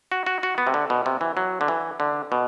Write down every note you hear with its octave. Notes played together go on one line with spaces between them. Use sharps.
F#4
F#4
F#4
B3
C3
D3
B2
C3
E3
F#3
D3
E3
D3
B2